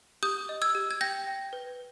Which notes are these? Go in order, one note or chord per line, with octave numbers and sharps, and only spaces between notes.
G4 D#6 G6
D#5
E6 G#6
G4
G#6
G5 G6 A#6
G5
B4